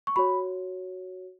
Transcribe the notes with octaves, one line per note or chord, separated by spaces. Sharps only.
C#6
F#4 C#5 B5